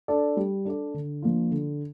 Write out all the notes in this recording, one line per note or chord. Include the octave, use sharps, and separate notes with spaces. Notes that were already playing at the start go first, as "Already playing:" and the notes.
D4 A4 D5
G3
D4 A4 D5
D3
F3 A#3 D4 F4
D3